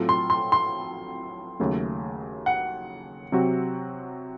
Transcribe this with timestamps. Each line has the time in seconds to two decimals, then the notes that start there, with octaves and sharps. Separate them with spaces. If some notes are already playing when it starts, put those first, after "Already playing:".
Already playing: A2 F#3 C4 F4 A4
0.09 C6
0.30 C6
0.52 C6
1.60 D#2 C#3 F#3 A3 C#4
2.46 F#5
3.32 C3 F#3 C4 F#4